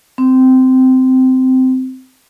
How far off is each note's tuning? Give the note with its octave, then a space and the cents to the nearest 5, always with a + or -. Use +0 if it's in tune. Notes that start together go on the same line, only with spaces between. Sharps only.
C4 -15